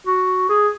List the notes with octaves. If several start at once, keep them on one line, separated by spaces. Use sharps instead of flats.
F#4
G#4